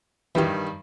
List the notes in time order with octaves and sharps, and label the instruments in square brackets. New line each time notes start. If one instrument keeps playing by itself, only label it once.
[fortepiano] G2 D#3 G3 [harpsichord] E3 G4